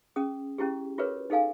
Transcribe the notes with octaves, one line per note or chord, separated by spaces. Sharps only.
C#4 G#4 D#6
C#4 E4 G4 G#4
F4 F#4 G#4 A#4 B4 C#5
D#4 G#4 A4 F5 G#5